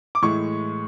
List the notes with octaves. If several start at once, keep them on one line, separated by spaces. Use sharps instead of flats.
D6
A2 E3 G#3 C#6